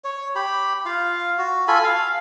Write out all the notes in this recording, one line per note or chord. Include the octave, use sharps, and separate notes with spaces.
C#5
G4 B5
F4 F5
F#4
F4 A4 G#5 B5
F5